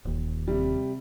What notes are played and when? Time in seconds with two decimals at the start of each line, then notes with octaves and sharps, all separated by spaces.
0.05 D#1 D#2
0.47 C3 G3